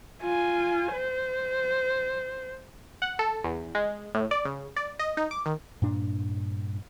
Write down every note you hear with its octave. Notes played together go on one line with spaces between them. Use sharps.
F4 G#5
C5
F#5
A4
E2
G#3
A2
D5
C#3
D5
D#5
D#4
D6
D#3
G2 A#2 D4